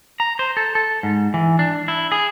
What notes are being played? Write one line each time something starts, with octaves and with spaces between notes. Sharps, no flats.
A#5
C5
A4
A4
G#2
E3
D4
E4
G#4